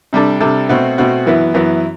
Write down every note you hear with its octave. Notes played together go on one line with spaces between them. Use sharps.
C3 G3 D4 A4
C3 G3 D4 A4
B2 A3 C4 F#4
B2 A3 C4 F#4
F#2 E3 B3 E4
F#2 E3 B3 E4